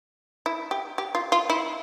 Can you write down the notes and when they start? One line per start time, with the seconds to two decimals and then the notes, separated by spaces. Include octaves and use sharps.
0.46 E4
0.71 G4
0.98 G4
1.15 F4
1.32 F4
1.50 E4